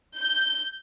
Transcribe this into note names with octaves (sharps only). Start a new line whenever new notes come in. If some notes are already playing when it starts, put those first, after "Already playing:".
G6